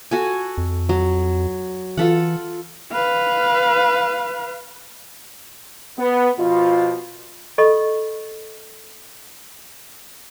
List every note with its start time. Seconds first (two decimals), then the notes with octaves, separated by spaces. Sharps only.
0.11 F#4 A4 G#5
0.58 F2
0.89 F#3
1.97 E3 F4 A4 F#5
2.92 B4 F5
5.98 B3
6.39 B2 F3 F4
7.58 A4 D#5 B5 C#6